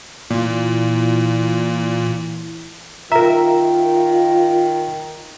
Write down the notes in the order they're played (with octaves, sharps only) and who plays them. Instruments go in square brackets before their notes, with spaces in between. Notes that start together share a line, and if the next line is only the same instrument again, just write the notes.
[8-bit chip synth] A#2 [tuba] E3
[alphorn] D#3 [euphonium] F4 [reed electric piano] A#4 E5 [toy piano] A#5